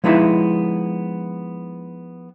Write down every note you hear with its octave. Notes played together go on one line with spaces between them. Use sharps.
F3 G#3 B3 D#4 E4 E5